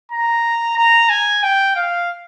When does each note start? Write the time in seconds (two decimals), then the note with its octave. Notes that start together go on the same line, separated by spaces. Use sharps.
0.12 A#5
0.78 A#5
1.09 G#5
1.43 G5
1.76 F5